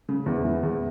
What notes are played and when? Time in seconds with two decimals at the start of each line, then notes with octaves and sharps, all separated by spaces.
0.09 C#3
0.26 E2
0.44 E3
0.63 E2